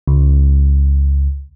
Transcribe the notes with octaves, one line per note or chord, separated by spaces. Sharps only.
C#2